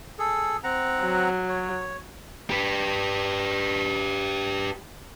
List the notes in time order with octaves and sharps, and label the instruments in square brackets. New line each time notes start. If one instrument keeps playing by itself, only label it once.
[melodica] G#4 A4
C4 F#5 A#5
[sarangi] F#3
[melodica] C#5
[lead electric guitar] G4 B4